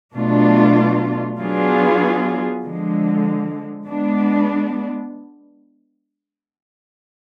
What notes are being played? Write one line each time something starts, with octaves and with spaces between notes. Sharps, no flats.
B2 F#3 A3 D4 F4
F#3 B3 D4 F4 G#4
D3 F3 G#3
G#3 B3 D4